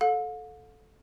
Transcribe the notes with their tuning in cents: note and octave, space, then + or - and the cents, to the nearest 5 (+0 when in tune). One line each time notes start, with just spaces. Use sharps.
A4 -10 F5 +45